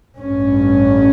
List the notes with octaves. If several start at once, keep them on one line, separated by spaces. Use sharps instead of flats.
A1 G2 C#4